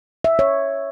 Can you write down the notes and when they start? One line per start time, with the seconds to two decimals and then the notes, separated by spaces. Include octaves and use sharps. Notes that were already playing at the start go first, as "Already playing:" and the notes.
0.24 E5
0.39 C#5